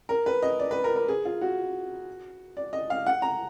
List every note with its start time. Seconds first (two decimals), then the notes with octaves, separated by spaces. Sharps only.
0.09 A#4
0.26 B4
0.42 D#5
0.59 D5
0.71 B4
0.84 A#4
0.96 A#4
1.08 G#4
1.25 F4
1.41 F#4
2.57 D5
2.73 D#5
2.90 F5
3.06 F#5
3.22 A#5